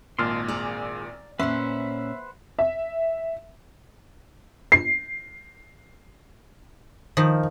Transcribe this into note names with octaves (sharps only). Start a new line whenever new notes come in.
G#1 A#2 D#5 A5 C6 F6
G#4 D5 A#5
A#2 C#4 B4 C5 E5 F#5
E5
C7
D#3 F3